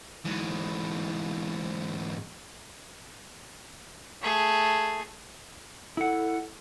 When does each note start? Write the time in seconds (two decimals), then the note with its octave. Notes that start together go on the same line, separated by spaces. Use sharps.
0.25 G#2 E3
4.22 A3 G#4
5.97 E4 A4 F#5